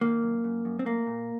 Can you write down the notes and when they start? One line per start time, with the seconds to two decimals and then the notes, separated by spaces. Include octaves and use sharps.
0.01 D#3 A#3
0.23 F#2
0.44 F#2
0.65 F#2
0.79 C4
0.85 A3 A#3
1.07 A#2